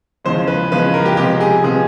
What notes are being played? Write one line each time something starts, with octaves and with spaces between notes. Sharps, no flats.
E2 C#3 F3 G#3 C5
B4
E2 C#3 F3 G#3 B4
A#4
G4
C3 F3 G#3 B3 G4
G#4
C3 F3 G#3 B3 G#4